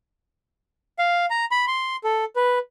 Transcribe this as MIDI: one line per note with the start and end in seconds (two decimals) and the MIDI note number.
0.99 1.25 77
1.30 1.45 82
1.51 1.65 83
1.68 1.96 84
2.04 2.24 69
2.36 2.59 71